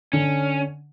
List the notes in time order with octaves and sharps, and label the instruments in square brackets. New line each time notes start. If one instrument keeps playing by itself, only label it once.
[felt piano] D3 [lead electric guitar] C#4